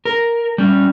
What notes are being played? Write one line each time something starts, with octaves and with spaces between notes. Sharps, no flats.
A#4
G3 C#4